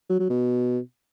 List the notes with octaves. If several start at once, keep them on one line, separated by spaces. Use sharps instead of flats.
F#3
F#3
B2